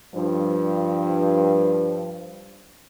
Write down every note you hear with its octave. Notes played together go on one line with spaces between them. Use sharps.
G2 F3